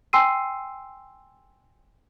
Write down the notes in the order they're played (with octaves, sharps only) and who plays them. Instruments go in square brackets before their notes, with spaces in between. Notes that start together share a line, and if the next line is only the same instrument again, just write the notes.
[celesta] G5 G#5 C6 E6 C7 D#7